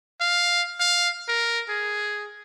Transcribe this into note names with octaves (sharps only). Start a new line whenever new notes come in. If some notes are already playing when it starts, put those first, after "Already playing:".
F5
F5
A#4
G#4